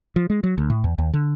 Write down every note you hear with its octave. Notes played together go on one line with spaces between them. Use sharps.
F3
G#3
F#3
D2
A2
E2
D#2
D3